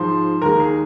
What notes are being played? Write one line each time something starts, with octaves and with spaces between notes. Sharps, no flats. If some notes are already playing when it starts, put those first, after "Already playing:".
Already playing: G#2 F3 G#3 C5
D#2 D#3 G#3 A#4
G#4